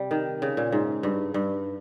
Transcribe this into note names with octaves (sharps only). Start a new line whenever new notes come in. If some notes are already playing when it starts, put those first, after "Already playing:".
Already playing: C3 G3
D#3
C#3
A#2
G#2
G2
G2